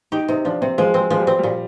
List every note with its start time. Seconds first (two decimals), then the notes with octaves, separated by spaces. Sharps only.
0.12 D#4 G4
0.29 C3 D#4
0.45 F3 D4
0.61 C3 C4
0.78 F3 G#3
0.94 G#3 C4
1.10 F3 G#3
1.20 G3
1.27 C4
1.39 A#2 G3